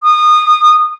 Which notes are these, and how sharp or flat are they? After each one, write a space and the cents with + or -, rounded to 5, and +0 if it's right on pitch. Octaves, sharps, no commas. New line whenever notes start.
D#6 -25